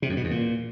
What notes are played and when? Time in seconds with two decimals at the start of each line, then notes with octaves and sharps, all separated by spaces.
0.02 C3
0.10 F#2
0.17 B2
0.24 E2
0.31 A#2